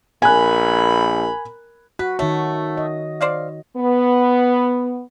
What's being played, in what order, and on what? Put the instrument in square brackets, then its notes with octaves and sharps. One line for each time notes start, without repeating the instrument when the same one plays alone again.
[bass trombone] A#1 [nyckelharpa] A#4 B5 [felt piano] G#5 F#6
[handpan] F#4 [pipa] B4
[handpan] D#3 D#4 C#5 [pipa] A3
[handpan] D#5
[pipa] C5 D5 F5
[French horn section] B3